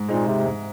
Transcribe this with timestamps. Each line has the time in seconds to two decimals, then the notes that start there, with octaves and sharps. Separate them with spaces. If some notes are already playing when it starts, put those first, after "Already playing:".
Already playing: G#2
0.09 A#2 G#3 C4 D#4
0.27 C3
0.46 G#2